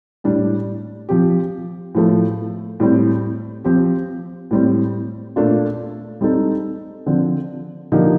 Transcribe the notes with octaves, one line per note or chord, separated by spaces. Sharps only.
A2 G3 D4
F3 C4 G4
A2 F3 A3
A2 G3 C4
F3 C4 G4
A2 G3 C4
A#2 A3 D4 F4
G3 C4 D#4 A4
D3 F3 C4
D3 F3 A#3 D#4 G4